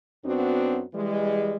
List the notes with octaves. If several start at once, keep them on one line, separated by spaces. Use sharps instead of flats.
F#2 B3 C4 D4 F#4
E3 G3 G#3